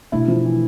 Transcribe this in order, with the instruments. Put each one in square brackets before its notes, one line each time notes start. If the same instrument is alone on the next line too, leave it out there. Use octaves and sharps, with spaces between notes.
[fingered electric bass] B2 A3 D4 [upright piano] E4
[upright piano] F3
E3